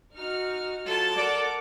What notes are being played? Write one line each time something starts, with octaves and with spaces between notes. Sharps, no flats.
D#4 F#4 F6
F#3 F4 A4 A5
A#4 D5 F#5 D6